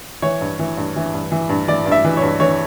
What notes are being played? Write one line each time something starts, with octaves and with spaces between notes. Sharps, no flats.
E3 C#5
G2
E3
G2
E3
G2
E3
G2
E3 D5
G2
E5
E3
C#5
G2
E3 C#5